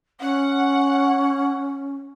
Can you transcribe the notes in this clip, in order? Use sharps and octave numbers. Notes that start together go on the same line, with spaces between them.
C#4 F#5